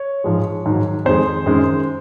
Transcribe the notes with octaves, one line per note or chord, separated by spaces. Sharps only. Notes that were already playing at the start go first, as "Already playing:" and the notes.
Already playing: C#5
G#2 F3 G#3
G#2 D#3 F#3
F2 D#3 G#3 C5
F#2 D#3 G#3